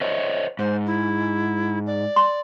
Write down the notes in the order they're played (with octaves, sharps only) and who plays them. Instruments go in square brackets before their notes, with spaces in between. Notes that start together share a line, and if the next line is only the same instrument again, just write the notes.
[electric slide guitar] C5 C#5 D#5
[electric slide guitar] G#2 [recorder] C5
[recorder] E4
D5
[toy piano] C6